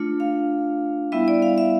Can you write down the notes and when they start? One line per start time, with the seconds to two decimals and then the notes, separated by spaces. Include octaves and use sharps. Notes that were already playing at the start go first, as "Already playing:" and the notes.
Already playing: A3 D4 F4
0.20 F5
1.12 G3 B3 E4 E5
1.28 D5
1.42 F5
1.58 E5